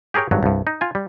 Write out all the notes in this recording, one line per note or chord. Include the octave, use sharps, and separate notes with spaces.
G4 G#4 A#4 C#5 G5
G#1 G2 F#3
C2 G2
D#4
F4 G#5
G3